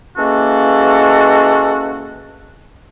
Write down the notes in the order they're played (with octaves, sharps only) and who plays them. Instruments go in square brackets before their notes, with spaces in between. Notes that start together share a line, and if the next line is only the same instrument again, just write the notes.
[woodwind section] E3 G#3 A#3 C#4 F#4 A4